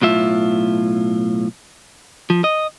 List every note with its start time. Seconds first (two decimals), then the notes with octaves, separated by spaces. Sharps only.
0.02 B1 A2 F4 E5
2.30 F3
2.44 D#5